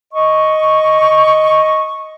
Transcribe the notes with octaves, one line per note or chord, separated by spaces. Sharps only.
D#5 C#6